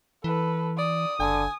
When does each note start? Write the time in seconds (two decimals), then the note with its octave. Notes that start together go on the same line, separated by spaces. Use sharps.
0.24 E3 A4 B4
0.78 D5 D#6
1.20 F#1 D3 G#5